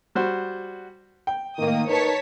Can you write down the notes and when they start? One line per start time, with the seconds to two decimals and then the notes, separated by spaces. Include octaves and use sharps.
0.15 G3 F#4 C5
1.27 G5
1.59 A2 D#3 A#3 D#6
1.88 D#4 A#4 B4 C#5 A5 B6